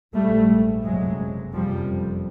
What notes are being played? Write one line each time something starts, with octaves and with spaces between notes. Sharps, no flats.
A#1 G#2 G3 A3
F#1 F2 C3 F#3 G#3
F#1 F2 C3 F3 G3